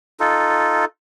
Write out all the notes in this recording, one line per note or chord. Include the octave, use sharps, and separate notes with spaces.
D#4 F4 A4